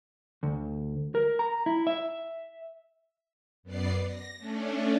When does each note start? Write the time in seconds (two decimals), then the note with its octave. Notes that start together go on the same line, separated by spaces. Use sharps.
0.43 D2
1.15 A#4
1.39 A#5
1.66 E4
1.87 E5
3.63 F#2 B3 D5 C7
4.06 A#6
4.38 A3 C#4 D4